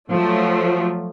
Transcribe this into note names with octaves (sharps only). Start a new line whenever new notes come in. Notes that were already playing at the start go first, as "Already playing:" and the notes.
F3 F#3 A3